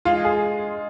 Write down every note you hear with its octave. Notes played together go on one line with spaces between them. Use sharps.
G#3 F4
G#4